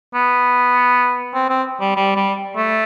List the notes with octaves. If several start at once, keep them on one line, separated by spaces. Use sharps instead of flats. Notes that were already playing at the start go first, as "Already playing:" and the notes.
B3
C4
C4
G3
G3
G3
A3